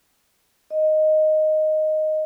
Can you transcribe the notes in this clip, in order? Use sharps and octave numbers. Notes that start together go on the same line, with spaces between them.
D#5